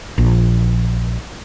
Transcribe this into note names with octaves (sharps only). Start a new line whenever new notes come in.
A#1